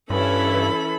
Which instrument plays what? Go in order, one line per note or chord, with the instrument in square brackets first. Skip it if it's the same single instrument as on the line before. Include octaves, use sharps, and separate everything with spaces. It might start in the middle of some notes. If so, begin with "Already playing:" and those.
[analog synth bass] G2 [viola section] E3 C#4 E4 [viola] A4 B5